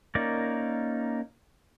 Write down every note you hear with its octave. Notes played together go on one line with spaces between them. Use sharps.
A#3 C#4 D#4 A#4 D5